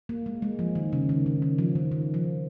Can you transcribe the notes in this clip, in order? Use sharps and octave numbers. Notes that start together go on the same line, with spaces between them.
A#3
G#3
G#3
F3
D#3
C#3
D#3
C#3
D#3
F3
D#3
D#3
F3